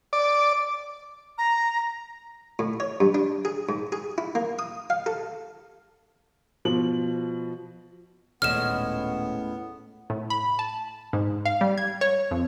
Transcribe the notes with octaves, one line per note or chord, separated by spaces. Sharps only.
D5
A#5
A2
C#5
G2
D4
G#4
G#2
G#4
E4
A#3
D#6
F5
A4
B2 F3 F#7
D#1 A2 G#3 B3 C#4 F6 E7
A2
B5
A5
G#2
F5
G3
G#6
C#5
F2